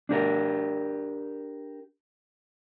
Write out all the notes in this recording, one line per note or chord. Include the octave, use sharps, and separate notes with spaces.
D4 G4 A#4